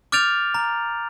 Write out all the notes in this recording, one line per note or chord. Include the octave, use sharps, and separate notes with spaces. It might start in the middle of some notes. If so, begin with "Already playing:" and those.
D6 F6 G6 A6 D7 F7
A#5